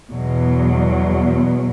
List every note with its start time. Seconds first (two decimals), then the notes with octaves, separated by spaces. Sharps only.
0.10 E2 B2 F#3